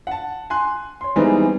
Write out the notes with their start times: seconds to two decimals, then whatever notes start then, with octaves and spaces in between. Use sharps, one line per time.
0.07 F#5 A5
0.50 G#5 C6 F#6
1.01 C#5 C6
1.16 E3 G3 G#3 B3 C4 D#4